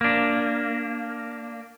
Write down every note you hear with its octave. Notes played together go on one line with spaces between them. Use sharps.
A#3 D4